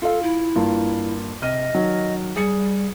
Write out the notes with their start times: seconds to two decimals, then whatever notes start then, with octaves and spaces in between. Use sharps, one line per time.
0.02 F4 A4 F5
0.23 E4
0.56 G2 A#3 F4
1.42 C3 D#5 F6 D#7
1.74 D#3 F#3
2.36 G3 G#4 C#7